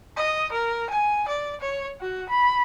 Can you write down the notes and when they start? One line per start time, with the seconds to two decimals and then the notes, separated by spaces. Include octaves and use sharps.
0.17 D#5
0.52 A#4
0.90 G#5
1.28 D5
1.61 C#5
2.00 F#4
2.29 B5